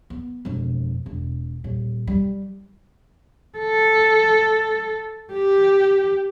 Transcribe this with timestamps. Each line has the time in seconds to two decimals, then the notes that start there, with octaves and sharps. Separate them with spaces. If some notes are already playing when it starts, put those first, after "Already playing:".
0.10 B3
0.45 E1 F2
1.06 E1
1.64 D#1
2.07 G3
3.58 A4
5.33 G4